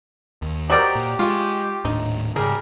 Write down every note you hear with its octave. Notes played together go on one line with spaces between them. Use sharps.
D#2
F#3 F#4 G4 A#4 C5 D5 D#5
A#2
G#3 F4 C#6
D#1 A2 D4 D#4
G#2 C#3 G3 G#4 A#4